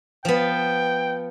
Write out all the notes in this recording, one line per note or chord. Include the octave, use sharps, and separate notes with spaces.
F3 B3 G5